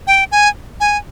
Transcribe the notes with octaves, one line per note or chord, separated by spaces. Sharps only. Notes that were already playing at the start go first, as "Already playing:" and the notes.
G5
G#5
G#5